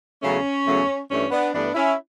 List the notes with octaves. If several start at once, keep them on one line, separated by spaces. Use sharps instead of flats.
E2 C#3 F#3 A3 C#4
E2 C#3 F#3 A3
G2 E3 A3 C#4
B3 D4
G2 E3 A3 B3 D4
C#4 E4